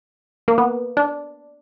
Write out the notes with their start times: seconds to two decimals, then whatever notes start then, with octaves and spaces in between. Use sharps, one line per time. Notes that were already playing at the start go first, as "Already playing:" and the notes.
0.48 A#3
0.58 B3
0.97 D4